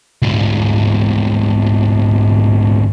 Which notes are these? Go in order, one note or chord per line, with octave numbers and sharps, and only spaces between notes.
D2 G#2